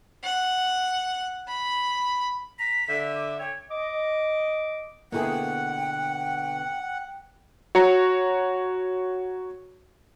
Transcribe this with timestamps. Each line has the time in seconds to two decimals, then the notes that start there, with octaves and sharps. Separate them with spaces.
0.24 F#5
1.48 B5
2.59 A#5 B6
2.89 D3 E5
3.15 D6
3.39 C#5 G5
3.70 D#5 D6
5.12 B2 D3 A#3 E4 G#4 F#5 G5
7.75 F#4 C#5 A#5 C#7